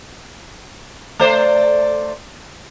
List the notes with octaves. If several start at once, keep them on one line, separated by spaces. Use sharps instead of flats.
A3 C5 D5